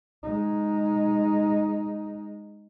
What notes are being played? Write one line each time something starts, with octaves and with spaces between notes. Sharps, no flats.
G#3 D#4